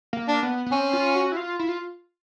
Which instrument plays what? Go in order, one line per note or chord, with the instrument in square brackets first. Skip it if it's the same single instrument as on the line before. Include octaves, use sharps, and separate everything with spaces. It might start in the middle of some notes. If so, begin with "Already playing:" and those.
[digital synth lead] A#3
[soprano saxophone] D4
[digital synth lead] B3
B3
[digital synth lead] C4 [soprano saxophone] C#4
[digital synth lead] F4
F#4
E4
F4
E4
F4